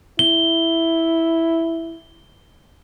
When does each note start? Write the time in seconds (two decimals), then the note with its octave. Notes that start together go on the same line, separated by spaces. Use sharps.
0.19 E4 G7